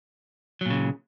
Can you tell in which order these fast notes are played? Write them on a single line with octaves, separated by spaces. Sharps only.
F#3 A#2 C#3